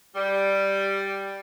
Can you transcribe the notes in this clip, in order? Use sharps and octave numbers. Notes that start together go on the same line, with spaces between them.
G3